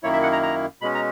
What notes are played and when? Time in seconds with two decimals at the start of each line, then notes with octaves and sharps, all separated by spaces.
0.03 F#2 D#3 A#3 E4 C#5
0.13 E5
0.23 F#5
0.33 A#5
0.43 A#5
0.81 B2 G#3 C#4 B5
0.95 A#5